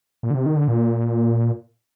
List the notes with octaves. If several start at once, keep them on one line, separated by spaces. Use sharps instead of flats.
A#2
D3
C3
D#3
D3
A#2